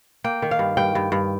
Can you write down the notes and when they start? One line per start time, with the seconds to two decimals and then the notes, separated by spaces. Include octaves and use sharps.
0.24 A#3 G5
0.42 D#3
0.51 F5
0.59 G2
0.77 G2 G5
0.95 G2
1.12 G2